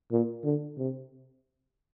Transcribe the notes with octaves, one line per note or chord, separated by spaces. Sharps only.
A#2
D3
C3